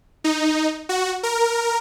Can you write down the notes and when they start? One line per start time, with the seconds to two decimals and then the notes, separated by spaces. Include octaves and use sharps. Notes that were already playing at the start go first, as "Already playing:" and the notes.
0.24 D#4
0.89 F#4
1.23 A#4